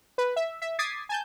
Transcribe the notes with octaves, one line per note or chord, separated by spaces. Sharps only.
B4
E5
E5
D6 D#6 G#6 A6 B6 C7
G#5 A5 G6